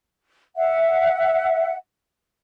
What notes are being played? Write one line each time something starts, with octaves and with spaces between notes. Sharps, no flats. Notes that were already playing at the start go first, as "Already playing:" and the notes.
E5 F#5